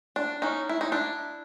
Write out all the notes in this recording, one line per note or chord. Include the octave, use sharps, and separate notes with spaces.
D4
C#4 D#4
E4
D#4
D4 E4